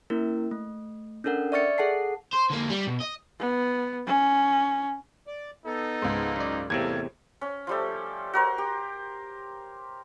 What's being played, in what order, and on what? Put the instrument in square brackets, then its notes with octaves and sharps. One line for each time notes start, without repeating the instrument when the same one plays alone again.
[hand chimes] A#3 C#4 E4 A#4
A3
C#4 D4 A4 A#4 F#5
D5 E5 C#6 F6 A6 C#7
G#4 A4 F#5 A5 C7
[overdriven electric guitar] C5
D3 A#3
G3
B2
D#5
[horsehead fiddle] B3
C#4
[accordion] D5
[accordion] B3 A4 [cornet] D#4
[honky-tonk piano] C#2 G#2
[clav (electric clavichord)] F#2 D5
[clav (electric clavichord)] E2 A2 C3 [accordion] G3 A4 [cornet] A#3 [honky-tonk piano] G#6
[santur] C#4
F3 G3 A3
F#4 A#4 C5
G4